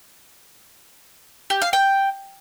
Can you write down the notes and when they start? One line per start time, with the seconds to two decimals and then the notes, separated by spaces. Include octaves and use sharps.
1.50 G4
1.62 F5
1.73 G5